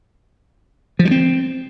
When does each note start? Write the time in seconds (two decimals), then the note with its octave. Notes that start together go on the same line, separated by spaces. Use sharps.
0.99 F3
1.05 G3
1.11 C4